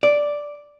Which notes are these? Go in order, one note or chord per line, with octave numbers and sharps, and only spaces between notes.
D5